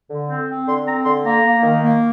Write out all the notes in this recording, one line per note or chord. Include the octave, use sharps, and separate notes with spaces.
D3
C4
C4
D3 C6
C4 A#5
D3 C6
A#3 A#5
A#3
D#3
A#3